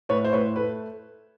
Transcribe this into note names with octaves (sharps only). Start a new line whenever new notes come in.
A2 B4 C#5
C5
A2 B4 C#5
A3 B4